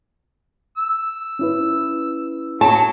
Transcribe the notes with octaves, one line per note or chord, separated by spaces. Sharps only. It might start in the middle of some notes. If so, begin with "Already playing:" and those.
E6
C#4 E4 B4
F#3 C#5 A5